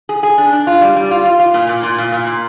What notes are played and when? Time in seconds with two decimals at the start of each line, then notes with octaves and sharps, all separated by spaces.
0.09 G#4
0.23 G#4
0.38 D4
0.53 D4
0.67 F4
0.81 G3
0.96 G3
1.11 F4
1.25 F4
1.39 F4
1.54 A#2
1.69 A#2
1.83 A#2
1.99 A#2
2.12 A#2
2.27 A#2